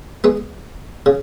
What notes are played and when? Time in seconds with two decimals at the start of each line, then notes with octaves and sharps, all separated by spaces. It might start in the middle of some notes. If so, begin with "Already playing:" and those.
0.24 G#3 B3
1.06 C#3